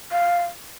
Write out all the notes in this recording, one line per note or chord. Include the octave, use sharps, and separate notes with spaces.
F5